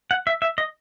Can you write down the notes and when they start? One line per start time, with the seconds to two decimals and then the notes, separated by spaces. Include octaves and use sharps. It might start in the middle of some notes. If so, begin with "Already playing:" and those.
0.11 F#5
0.27 E5
0.42 E5
0.58 D#5